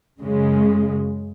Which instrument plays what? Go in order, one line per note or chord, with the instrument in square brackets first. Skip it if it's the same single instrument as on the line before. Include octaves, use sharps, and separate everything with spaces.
[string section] F#2 C#3 G#3